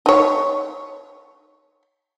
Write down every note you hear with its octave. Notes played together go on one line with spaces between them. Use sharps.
D#4 C#5